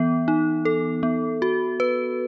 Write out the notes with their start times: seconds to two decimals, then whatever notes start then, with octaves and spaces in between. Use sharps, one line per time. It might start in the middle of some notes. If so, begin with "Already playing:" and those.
Already playing: E3 B3
0.28 D#4
0.65 A4
1.03 B3
1.42 F#4
1.80 B4